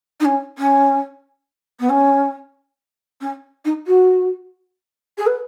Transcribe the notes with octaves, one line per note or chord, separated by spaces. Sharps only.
D#4
C#4
C#4
B3
C#4
C#4
D#4
F#4
G#4
B4